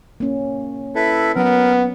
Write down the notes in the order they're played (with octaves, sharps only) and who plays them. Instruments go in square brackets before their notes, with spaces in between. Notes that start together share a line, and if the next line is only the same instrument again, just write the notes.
[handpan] A#3 C#4
[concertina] E4 A4 B4
[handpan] F#3 C#4 [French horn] B3 [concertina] A#4